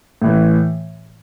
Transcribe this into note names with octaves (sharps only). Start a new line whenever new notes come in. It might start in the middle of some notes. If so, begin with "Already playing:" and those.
A2 E3